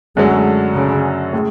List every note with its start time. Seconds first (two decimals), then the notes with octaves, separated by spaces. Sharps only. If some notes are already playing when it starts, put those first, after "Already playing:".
0.16 F#2 D3 F#3 G#3 A3
0.75 C#3
1.33 A2 G#3